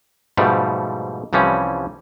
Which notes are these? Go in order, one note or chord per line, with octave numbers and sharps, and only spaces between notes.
G#2 B2 F3 G3 A3
C2 E3 F3 G3 C#4